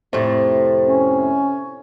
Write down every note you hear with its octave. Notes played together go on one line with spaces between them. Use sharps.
F2 A2 C3
C#4